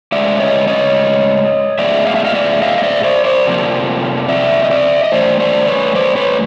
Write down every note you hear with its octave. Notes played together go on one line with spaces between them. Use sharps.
A2 F3 G#3 D5 E5
C#5 D#5
C#5 D#5
A2 E3 G#3 B3 D5 E5
F5
E5
D#5 F5
D5 E5
D#5 F5
D#5
D5 E5
C5 D5
C5 D5
F2 C3 F3 A#3
D5 E5
D#5
D5 E5
D#5
G2 E3 A3 C5 D5
C5 D5
B4 C#5
C5 D5
B4 C#5